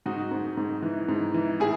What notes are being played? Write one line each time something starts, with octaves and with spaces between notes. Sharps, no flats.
G#2 D#4 F#4
G#2
G#2
E3
G#2
E3
A2 E4 G#4